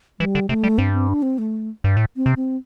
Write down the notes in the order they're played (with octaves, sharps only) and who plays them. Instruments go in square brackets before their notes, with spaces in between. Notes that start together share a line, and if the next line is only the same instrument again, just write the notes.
[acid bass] E3 [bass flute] G3
[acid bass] D3
[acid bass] C3 [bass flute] A3
[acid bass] G3
[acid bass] G2 [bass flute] C4
[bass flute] C4
D4
C4
A3
[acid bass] G2
A2
[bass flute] C4
[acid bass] C3
[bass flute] C4